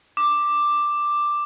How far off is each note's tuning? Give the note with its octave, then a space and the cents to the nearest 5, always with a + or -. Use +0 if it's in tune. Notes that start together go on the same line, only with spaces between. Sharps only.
D6 +5